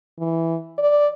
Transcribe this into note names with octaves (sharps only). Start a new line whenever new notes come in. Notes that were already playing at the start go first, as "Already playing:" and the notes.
E3
D5